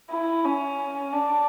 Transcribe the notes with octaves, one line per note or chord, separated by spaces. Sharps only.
E4
C#4
D4